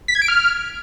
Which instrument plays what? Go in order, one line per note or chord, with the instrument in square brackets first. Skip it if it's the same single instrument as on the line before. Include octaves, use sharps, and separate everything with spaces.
[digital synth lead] B6
G#6
D7
F6